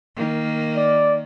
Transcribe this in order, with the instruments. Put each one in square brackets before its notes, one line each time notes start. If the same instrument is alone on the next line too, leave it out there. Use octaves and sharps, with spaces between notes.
[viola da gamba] D#3 A#3
[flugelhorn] D5